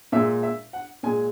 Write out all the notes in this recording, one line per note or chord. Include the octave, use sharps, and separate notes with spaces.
A#2 G#3 E5
E5
F#5
A#2 G#3 G#5